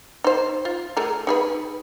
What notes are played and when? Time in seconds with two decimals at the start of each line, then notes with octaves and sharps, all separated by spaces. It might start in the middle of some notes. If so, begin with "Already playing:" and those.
0.24 D#4 C5
0.65 F4
0.97 A3 G#4 A#4
1.27 D#4 G#4 B4